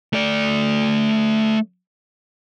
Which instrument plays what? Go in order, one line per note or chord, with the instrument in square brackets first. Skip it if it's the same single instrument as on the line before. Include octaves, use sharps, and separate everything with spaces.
[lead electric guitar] A3 D5